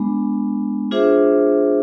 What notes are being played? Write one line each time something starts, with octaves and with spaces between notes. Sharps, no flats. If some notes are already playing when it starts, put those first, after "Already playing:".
Already playing: G#3 B3 D4
D4 F4 G#4 C5 E5